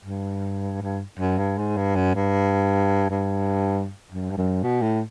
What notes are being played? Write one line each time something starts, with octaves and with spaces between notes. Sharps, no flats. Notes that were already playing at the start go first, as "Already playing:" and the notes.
G2
G2
F#2
G2
G#2
G2
F#2
G2
G2
F#2
G2
F#2
B2
A2